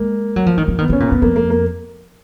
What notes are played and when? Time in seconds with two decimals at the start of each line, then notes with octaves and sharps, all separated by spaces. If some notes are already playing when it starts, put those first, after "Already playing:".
Already playing: G#3 A#3
0.36 F#3
0.46 F3
0.57 D#3
0.68 F3
0.78 D#3 B3
0.90 C#3 C#4
1.00 A#2
1.08 F#2 B3
1.22 F2 A#3
1.36 A#3
1.50 A#3